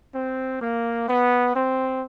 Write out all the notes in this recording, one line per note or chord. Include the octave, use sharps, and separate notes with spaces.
C4
A#3
B3
C4